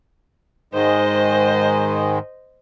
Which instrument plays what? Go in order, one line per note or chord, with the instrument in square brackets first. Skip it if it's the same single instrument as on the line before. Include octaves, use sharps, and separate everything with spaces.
[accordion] G#2 D#3 G#3 [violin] C5 D#5